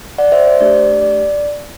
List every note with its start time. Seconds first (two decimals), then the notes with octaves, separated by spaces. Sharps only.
0.18 D5 F#5
0.32 C5 E5
0.47 C5
0.60 A3 D4 G4 D5
1.02 D5